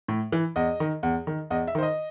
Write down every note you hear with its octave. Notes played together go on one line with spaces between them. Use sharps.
A2
E3
E2 D#5
D#3
E2
D#3
E2 D#5
E5
D#3 C5
D#5